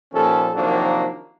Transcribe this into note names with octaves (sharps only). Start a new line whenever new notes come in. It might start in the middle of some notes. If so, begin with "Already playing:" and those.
D#2 A#2 F3 C#4 A4
C3 D#3 F3 F#3 A#3 D4